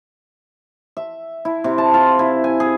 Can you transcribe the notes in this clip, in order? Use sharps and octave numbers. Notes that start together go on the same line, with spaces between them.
E5
E4
C3
A5
F4
E4
G#5
G#4